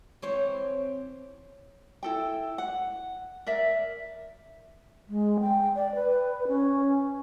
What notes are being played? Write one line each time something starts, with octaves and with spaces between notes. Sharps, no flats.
E3 C4 C#5
E4 A4 G5
F#5
A#4 D5 E5
G#3
G5
D5
B4
C#4